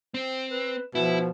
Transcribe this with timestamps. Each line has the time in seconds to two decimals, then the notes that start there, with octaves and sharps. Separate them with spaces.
0.14 C4
0.50 B4
0.95 B2 F3 E4